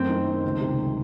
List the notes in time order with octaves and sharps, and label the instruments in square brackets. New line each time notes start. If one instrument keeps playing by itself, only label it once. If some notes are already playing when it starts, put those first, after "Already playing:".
Already playing: [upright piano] F#2 A3 [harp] C4
[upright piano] D#3
D#3
C#2
C3